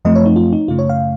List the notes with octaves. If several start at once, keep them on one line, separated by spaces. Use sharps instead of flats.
F#2 F3 A3 C4 D#5
C#5
D#4
F4
D#4
F#2 C#3 A3 F4
C#5
F5